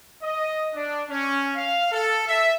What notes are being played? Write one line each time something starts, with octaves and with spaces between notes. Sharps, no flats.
D#5
D4
C#4
F5
A4
E5